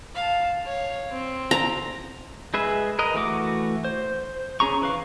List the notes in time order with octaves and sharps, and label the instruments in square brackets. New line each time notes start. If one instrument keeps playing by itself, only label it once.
[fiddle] F5 A5
C#5 F5
C4
[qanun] A#5
[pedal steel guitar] G#3 G#4 B4 E5
A#4 B4 D#5
E3 A3 F#4 D6
C5
C#4 G#4 A#5 C#6
E3 B4 F5